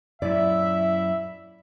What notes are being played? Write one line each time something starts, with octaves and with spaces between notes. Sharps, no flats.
F#2 A#2 F#3 E4 D5 E5